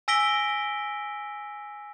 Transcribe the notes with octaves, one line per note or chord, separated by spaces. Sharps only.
G#5 E6 A#6 B6 D7 G7